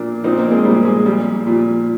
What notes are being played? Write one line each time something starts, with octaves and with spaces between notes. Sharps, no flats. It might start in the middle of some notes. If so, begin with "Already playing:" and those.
Already playing: A#2 F3 A#3 D4
A#2 F3 C4 D#4
A#3 D4
G#3 C4
A#2 F3 G3 A#3
G#3
A#2 F3 G3
A#2 F3